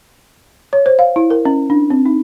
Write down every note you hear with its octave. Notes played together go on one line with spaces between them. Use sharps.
C#5
C5
F5
E4
A#4
C#4
D4
C4
D#4